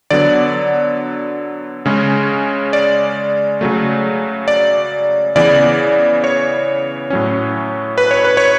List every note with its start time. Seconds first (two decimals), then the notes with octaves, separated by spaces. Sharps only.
0.10 D3 F#3 B3 D5
1.86 C#3 G#3 C#4
2.73 D5
3.61 C#3 F#3 A3
4.48 D5
5.36 C#3 E3 B3 D5
6.24 C#5
7.10 A2 F#3 C#4
7.98 B4
8.11 C#5
8.25 B4
8.37 C#5